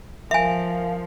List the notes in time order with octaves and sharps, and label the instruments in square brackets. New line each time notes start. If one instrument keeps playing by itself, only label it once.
[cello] F3 [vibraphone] A#4 F5 [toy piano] E5 G#5